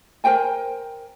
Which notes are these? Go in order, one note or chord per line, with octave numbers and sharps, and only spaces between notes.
A#4 C5 G5 G#5